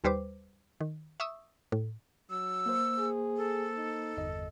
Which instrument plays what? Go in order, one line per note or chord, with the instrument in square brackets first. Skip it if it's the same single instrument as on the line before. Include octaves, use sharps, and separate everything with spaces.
[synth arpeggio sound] D#2 G3 B4 C5 D6
D#3
E5 C#6 D#6 E6
A2
[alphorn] F#3 [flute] E6
[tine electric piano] A#3 C5
[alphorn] G#4
[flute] A4
[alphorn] D#4
[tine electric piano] G1 E2 D#5